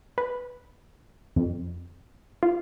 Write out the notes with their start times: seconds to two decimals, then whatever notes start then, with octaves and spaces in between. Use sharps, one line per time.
0.18 B4
1.36 F2
2.43 F4